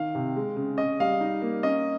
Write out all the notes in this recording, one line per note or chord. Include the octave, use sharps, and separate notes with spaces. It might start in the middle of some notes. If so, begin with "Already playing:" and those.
Already playing: D#3 F5
C3
G#3
C#3
C#4 D#5
G3 F5
D#4
A#3
C#4 D#5